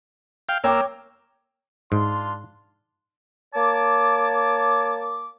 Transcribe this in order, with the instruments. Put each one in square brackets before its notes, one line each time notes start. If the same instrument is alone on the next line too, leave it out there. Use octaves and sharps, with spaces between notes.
[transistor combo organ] F5 G5
[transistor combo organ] A#3 E6 [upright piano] C#5 G5 D6
[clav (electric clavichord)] G#2 [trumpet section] D4 F4 C6
[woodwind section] A#3 C#5 A5 D6